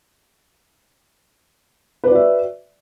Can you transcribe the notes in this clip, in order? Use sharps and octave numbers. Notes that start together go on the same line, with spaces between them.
F#4 B4 D5 E5